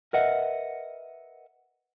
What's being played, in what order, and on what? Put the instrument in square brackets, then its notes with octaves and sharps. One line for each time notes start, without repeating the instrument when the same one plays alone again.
[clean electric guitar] A#4 B4 D#5 E5 F#5